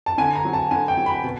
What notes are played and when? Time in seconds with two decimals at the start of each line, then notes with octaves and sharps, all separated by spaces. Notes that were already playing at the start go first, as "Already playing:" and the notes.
0.06 A5
0.18 D3 G#5
0.35 A#5
0.45 F#3
0.53 A5
0.71 D3 G#5
0.88 G5
0.97 F#3
1.06 B5
1.24 B2